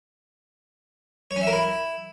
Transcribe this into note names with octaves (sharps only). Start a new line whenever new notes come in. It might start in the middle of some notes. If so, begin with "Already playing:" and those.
C#5
C#4
E5
A#4
E4